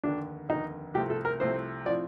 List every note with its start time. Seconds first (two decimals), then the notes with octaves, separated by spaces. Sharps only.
0.04 F1 D#2 D3 D4
0.49 F1 D#2 D3 D#4
0.94 C2 C3 F3 A3 C4 G4
1.10 A4
1.25 A#4
1.40 C2 C3 F3 A3 C4 C5
1.85 A2 F3 C4 D5